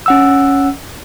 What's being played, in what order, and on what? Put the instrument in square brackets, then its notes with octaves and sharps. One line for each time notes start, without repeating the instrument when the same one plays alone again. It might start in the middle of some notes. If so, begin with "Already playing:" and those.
[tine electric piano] C#4 F#5 E6